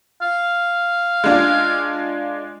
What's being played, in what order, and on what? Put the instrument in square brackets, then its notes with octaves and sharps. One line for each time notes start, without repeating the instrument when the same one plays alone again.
[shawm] F5
[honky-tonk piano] G#3 D4 F4